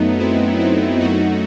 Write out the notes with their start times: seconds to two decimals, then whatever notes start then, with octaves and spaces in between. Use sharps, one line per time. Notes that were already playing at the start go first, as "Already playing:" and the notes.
Already playing: F#2 F#3 A3 B3 D#4
0.19 C4 E4
0.59 C4 E4
1.00 F#2 F#3 A3 D#4 F#4